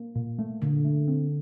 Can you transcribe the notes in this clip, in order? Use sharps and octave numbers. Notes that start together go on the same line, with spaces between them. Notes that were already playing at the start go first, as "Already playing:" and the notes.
Already playing: A#3
A#2
A3
A#2 D3
A3
C4